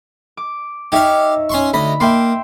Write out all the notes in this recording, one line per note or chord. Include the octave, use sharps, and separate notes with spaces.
D6
D#4 G4 C#5 E5 F5
C#4 C6 C#6
D2 D#5 B5
A#3 E5 G5 C6